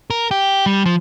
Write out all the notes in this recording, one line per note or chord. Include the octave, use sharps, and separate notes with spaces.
A#4
G4
G3
F3